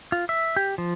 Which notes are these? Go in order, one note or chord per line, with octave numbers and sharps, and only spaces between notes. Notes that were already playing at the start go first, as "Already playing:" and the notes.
F4
E5
G4
F3